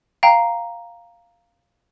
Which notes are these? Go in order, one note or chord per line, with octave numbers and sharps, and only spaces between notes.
F5 G5 A#5